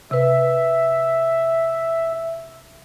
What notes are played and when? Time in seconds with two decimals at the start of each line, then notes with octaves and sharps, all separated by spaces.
0.11 C3 B4 E5